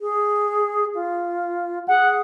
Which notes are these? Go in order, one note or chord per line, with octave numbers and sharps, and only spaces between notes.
G#4
F4
G#4 F#5